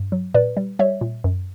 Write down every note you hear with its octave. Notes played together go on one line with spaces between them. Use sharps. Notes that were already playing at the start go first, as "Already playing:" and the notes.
Already playing: G2
F#3
A#2 B4 D5
G3
G3 C#5 E5
A#2
F#2